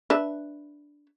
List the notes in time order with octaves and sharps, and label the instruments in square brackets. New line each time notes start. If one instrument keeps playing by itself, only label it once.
[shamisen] D4 B4 E5